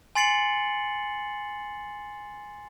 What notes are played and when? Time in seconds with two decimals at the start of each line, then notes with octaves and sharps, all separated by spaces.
0.15 G#5 C6 A6 C7 C#7 F#7